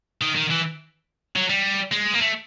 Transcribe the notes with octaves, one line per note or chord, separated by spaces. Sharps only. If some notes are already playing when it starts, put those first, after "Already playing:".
D#3
D#3
E3
F#3
G3
G#3
A#3
A3